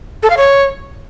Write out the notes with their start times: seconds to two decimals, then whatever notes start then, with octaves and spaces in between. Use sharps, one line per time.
0.23 A4
0.30 F5
0.37 C#5